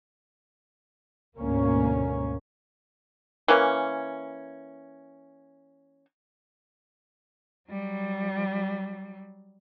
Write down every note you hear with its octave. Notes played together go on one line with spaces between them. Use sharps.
D2 G#2 B2 A#3 C#4
E3 A#3 C#4
F#3 G3